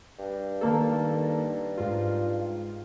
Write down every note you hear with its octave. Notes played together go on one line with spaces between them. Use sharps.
G2
D#3 A#3 A4
G#2 F4